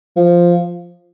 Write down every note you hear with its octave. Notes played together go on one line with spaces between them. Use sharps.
F3